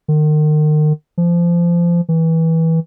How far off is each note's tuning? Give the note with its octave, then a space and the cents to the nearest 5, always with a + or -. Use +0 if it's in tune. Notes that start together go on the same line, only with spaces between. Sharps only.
D#3 -35
F3 -25
E3 -20